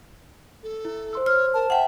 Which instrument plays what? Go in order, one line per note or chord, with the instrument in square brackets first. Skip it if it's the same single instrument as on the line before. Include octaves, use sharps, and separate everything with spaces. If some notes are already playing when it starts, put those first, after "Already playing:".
[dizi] A4
[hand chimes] E4
C5 C6 E6
[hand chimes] C5 [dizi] C#5 [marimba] F6
[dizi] A#4 [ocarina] A5
[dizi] E5 [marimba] F#5 G5